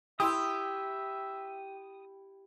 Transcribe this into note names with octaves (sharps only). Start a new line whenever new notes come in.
E4 G4 E5 C6 D#6 E6